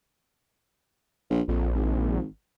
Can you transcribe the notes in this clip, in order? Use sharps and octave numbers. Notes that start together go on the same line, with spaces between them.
A#1
A#1 F2
G#1